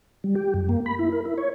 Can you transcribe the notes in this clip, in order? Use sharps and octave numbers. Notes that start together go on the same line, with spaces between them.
G3
G4
F#2
A#3
B5
E4
A#4
E4
C#5